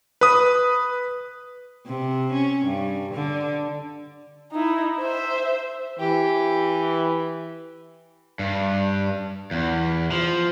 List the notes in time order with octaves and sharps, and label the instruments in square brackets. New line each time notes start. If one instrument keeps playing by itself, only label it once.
[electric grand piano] B4 D#6
[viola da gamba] C3
C#4
G2
D3
[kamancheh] D#4 E4
C5 E5
[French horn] E3 [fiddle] G4
[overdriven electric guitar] G2
E2
F3